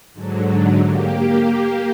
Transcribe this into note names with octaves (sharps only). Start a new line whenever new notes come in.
G#2 D3 F#3
A#3 G4